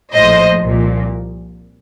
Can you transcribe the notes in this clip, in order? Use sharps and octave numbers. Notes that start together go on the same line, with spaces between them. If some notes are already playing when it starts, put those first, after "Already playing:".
A#1 A2 F3 C5 D#5
C2 A#2 F3